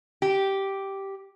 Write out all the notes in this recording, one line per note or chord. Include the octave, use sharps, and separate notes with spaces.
G4